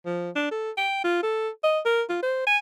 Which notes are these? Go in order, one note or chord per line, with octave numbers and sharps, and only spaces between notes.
F3
D4
A4
G5
F4
A4
D#5
A#4
F4
C5
G#5